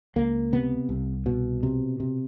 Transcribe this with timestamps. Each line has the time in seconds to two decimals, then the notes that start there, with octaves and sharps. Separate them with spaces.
0.16 C#2 A#3
0.53 C3 B3
0.89 C2
1.26 B2
1.63 C3
2.00 C3